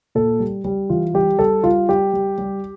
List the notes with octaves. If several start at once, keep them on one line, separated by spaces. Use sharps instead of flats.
A#2 A4
G3
G3
E3 F4
G3 G4
G3 A4
G3 F4
G3 G4
G3
G3